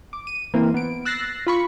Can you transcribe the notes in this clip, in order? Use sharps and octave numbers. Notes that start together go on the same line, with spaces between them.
D6
D#7
E3 A#3 C4
B3 D7
E6 F#6 A6 A#6 C7
F4 B5 C#6